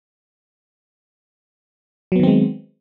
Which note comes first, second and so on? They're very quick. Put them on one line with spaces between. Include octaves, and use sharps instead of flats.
F#3 B3 D#3 C4 G#3